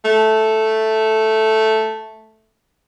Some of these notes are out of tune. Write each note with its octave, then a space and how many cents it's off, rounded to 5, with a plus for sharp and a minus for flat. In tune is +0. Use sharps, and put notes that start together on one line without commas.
A3 +0